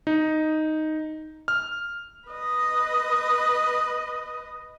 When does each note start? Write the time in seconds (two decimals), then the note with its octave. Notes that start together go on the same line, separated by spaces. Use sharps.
0.07 D#4
1.48 F6
2.28 B4 D#5